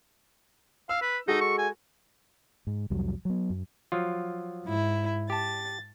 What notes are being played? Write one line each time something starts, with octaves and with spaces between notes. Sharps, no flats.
F5 E6
B4
G#3 D#4 F#4 A4
C#6
G#5
G#2
C2 F2 F#3 G3
F#3 B3
F#2
F3 F#3 F4
G#2 E4
G4 A5 A6